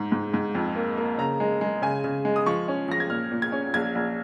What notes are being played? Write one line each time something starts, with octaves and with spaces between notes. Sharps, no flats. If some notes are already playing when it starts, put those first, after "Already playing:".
Already playing: G#2
G#2
G#2
F2
A#3
A#3
C#3 A#5
G#3
G#3
C#3 G#5
C#3
G#3
D#6
F3 C#6
C#4
F3 A#6
G#6
A#2 F6
A#2
G#6
C#4
A#1 G#6
A#1